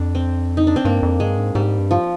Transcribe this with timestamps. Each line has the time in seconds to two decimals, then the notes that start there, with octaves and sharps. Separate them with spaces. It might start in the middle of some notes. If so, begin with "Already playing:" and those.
Already playing: F2 D4
0.15 C4
0.57 D#4
0.67 D4
0.76 C4
0.85 G2 A#3
1.03 F2
1.20 G2 G#3
1.37 G#2
1.55 G#2 G3
1.79 G2
1.91 F3